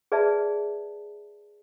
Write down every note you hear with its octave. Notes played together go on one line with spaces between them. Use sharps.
G#4 B4 D5 E5 A5